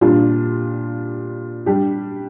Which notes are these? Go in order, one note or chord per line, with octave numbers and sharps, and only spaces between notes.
A#2 G3 D4 F4
G3 D4 G4